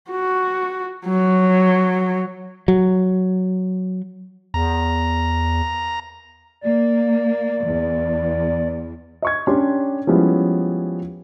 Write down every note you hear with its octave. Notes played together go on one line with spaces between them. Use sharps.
F#4
F#3
F#3
E2 A#5
A#3 D5
E2
D#5 C#6 G#6
C#4 D4 G4 C6
F3 G3 G#3 B3 C#4 E4